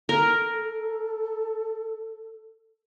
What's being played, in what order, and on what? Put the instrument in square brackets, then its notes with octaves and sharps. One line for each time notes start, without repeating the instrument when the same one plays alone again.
[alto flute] A4 [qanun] A#4